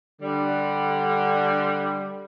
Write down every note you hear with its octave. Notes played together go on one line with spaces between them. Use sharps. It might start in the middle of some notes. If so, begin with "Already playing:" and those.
D3 G3